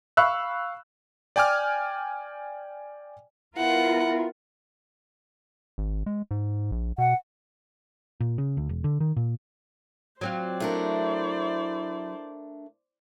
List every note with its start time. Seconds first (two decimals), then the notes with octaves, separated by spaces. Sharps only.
0.17 F5 B5 C#6 E6 F#6
1.36 D5 G5 G#5 D6 F6
3.58 B3 E4 F4 A#4 F#5
5.78 G#1
6.06 G#3
6.31 G#2
6.72 A#1
6.98 B2 F#5
8.20 A#2
8.38 C#3
8.57 D2
8.69 E1
8.84 D3
9.00 D#3
9.17 A#2
10.21 F#3 C4 F4 C5 D5
10.60 A3 D4 E4 A#4